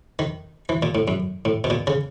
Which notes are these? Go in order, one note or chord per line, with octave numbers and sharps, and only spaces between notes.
D#3
E3
A#2
A2
F#2
A2
B2
A#2
C#3